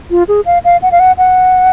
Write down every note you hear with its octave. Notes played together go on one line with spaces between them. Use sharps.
F4
G#4
F5
F5
F#5
F5
F#5
F#5